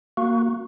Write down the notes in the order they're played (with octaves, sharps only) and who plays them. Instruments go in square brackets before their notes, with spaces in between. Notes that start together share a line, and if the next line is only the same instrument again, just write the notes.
[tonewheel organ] A#3 F#4